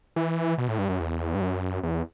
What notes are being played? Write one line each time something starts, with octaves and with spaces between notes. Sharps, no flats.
E3
B2
A2
G2
F#2
E2
G2
F#2
E2